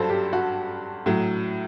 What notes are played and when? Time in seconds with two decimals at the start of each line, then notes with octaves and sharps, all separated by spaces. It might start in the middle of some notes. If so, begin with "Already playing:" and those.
Already playing: G2 F#3 A4 C5
0.09 G4
0.33 F#4
1.06 A2 F#3